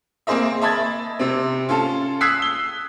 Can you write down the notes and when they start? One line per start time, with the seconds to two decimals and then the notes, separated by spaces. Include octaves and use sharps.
0.27 A#3 C4 G#4 C5 D#5 E5
0.61 D#5 E5 A5 B5 G#6 A6
1.19 C3 C4
1.69 C#4 F4 A4 A5
2.21 D#6 E6 F#6 G#6 B6 C7
2.42 G7